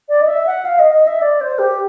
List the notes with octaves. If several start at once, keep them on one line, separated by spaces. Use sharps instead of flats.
D5
D#5
E5
F#5
F5
D#5
D#5
E5
D5
C5
G4